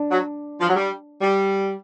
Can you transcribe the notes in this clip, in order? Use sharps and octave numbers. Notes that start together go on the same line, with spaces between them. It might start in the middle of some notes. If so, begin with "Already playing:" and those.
Already playing: D4
F#3
F3
F#3
G3
G3